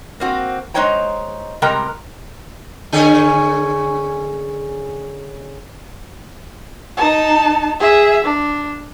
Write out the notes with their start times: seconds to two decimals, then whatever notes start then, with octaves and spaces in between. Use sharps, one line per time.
0.20 A#3 C4 F#4
0.74 G#3 D#4 C5 C#5 G5 A#5
1.62 C3 G3 G#3 A#4 G5 A#5
2.93 D3 C#4 G#4
6.97 D#4 A5
7.80 G#4 E5
8.25 D4